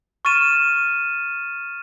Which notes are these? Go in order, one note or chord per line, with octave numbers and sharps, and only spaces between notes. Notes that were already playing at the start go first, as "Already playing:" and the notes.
C#6 F6 A6 D#7 E7